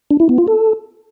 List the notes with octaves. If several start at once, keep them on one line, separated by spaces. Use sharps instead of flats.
D4
E4
B3
F4
A4